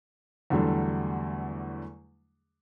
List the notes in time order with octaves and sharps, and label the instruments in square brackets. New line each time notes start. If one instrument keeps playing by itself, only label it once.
[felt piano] E2 D3 F#3 G3 A3 D4